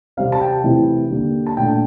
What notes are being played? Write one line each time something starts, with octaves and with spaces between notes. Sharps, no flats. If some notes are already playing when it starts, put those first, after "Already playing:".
C3 G3 C4 F5
A5
G5
C3 E3 A3 C4 E4
D3 G3 A#3
A5
A#2 A3 D4 G5